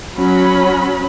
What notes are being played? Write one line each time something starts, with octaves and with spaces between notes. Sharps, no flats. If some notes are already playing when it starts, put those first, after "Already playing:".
F#3 C#4 B5